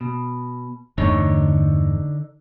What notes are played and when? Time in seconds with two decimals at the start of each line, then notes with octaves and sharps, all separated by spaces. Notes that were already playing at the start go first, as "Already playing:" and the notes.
0.01 B2
0.98 G1 E2 D3 A3 D#4 C#5